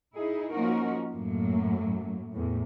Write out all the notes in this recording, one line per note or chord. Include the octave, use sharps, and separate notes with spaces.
D#4 E4 G#4
F3 A#3 C#4 D#4 F#4 A#4
F#2 A2 F#3 A#3
E2 A2